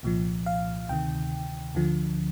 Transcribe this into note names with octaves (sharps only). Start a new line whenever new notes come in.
C2 A#2 F3
F5
D2 C3 D#3 G5
D2 D3 F3